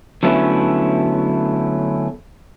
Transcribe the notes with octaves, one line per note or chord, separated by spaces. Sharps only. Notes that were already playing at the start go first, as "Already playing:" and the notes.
D3 F#3 A3 B3 C#4 E4